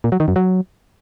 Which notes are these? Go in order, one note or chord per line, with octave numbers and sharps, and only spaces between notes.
A#2
F#3
D#3
F#2
F#3